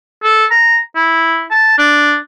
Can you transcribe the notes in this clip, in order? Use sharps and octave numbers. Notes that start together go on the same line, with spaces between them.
A4
A#5
E4
A5
D4